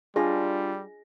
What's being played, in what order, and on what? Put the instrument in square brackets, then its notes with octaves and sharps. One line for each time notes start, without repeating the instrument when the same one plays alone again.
[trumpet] G3 [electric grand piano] D4 F4 A#6 [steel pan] G#4